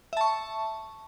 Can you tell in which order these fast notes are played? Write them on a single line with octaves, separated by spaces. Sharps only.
E5 A5 C#6